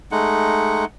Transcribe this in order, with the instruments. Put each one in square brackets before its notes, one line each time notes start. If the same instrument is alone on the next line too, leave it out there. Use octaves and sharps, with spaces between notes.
[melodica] G#3 A3 D#4 F#5